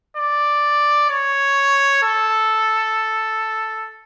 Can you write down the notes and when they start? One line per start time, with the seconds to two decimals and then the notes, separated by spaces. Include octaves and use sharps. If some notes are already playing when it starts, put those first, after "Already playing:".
0.17 D5
1.09 C#5
2.03 A4